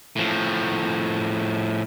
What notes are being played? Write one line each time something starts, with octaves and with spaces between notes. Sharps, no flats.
A2 F3